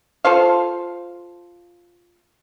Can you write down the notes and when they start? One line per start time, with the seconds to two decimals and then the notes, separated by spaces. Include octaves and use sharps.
0.25 F4 A4 C5 F5